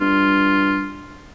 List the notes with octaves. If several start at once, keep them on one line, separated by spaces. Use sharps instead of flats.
G2 F4